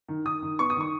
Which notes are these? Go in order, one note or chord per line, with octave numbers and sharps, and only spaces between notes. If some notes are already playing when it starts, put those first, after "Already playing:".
D#3
D#3 D#6
D#3
B3 C#6
D#6
D#3 C#6